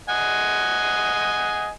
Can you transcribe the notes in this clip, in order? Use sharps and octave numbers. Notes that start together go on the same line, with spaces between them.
D#5 F#5 G#5